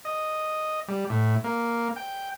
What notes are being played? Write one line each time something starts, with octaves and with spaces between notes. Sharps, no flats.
D#5
G3
A2
A#3
G5